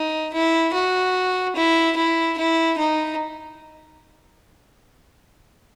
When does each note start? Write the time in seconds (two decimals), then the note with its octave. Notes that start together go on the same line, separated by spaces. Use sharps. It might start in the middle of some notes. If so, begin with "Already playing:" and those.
Already playing: D#4
0.33 E4
0.74 F#4
1.56 E4
1.96 E4
2.37 E4
2.78 D#4